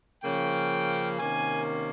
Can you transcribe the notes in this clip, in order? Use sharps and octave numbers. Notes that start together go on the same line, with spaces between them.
C#3 F3 A#3 C#4 G5
C3 D#3 A#3 C#4 G#5